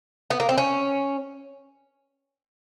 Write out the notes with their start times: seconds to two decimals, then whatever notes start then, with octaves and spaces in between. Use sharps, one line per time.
0.30 B3
0.40 A#3
0.49 C4
0.58 C#4